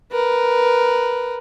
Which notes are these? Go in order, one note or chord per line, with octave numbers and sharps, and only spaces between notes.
A#4 B4